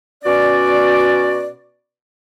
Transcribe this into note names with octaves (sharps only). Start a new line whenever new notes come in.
B2 C#4 F#4 D5